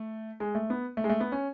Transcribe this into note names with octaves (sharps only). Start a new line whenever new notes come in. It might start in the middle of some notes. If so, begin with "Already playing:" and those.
Already playing: A3
G#3
A3
B3
A3
G#3
A3
B3
C#4